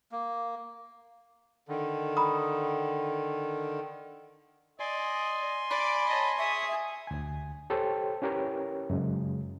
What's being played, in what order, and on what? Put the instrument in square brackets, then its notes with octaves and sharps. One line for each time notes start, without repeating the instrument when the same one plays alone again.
[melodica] A#3
[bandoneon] D3 D#3
[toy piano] A#5 B5 D#6
[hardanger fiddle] D5 [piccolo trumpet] D#5 [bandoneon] G#5 C6
[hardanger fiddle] D5 [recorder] B5 [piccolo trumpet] D6
[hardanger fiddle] C#5 D#5 [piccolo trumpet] A5
[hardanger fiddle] G#4 D#6 [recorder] E5 [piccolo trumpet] C#6
[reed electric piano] D2 G#5
G4 A4 C5 C#5 G5
C#4 E4 G4 A#4 B4 C#5
F#2 C#3 G#3